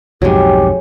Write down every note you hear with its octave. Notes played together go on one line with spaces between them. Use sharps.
B1 F2 G#2 F#3 G#3 G4